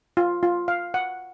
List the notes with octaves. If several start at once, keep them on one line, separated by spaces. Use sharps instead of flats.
F4
F4
F5
F#5